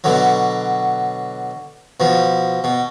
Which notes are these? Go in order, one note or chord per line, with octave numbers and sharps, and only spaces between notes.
B2 D3 F#3
B2 F3
B2